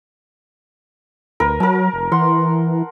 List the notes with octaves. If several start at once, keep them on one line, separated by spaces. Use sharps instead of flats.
D2 A#4 B4
F#3 A#4 A5
F1
E3 F#5 C6